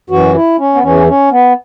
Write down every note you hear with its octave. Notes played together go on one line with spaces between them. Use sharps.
F#2 E3 F#4
E4
C#4
B3
E2 E3 C#4
C#4
B3